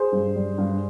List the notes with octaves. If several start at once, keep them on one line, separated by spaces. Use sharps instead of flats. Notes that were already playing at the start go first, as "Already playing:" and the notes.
Already playing: G#4 C5
G2
G3
G2